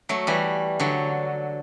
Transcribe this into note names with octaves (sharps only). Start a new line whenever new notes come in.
F#3 A3
E3 G3
D3 F#3